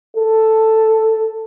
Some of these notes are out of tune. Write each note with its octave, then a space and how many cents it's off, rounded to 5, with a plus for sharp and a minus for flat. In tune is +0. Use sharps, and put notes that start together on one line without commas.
A4 +5